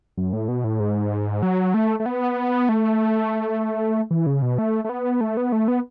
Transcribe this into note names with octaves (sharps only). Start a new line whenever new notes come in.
F#2
A2
B2
A2
G#2
F#3
A3
A3
B3
A3
E3
C#3
B2
A3
A3
B3
A3
B3
A3
B3